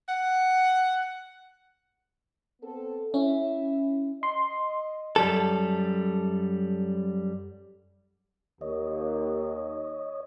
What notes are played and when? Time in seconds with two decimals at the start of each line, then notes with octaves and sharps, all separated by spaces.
0.09 F#5
2.62 B3 C4 A4
3.14 C#4 E4 E5
4.23 D#5 C6
5.16 F#2 G3 A4
8.61 D#2 C#5 D#5